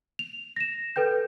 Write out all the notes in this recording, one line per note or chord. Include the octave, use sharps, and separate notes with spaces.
F7
A#6 E7
A4 B4 G5 G6